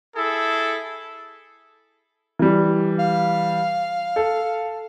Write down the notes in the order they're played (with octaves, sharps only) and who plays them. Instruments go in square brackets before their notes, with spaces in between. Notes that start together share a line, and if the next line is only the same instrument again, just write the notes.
[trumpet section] E4 G#4 A4
[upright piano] E3 G3
[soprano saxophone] F5
[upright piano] A4